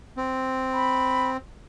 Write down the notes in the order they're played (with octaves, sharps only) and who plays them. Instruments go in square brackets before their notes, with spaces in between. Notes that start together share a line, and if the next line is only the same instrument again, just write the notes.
[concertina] C4
[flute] B5